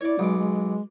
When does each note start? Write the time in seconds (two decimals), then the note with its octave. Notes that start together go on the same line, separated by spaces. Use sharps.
0.01 E4 C#5 D5
0.19 B1 G#3 D6
0.38 G#3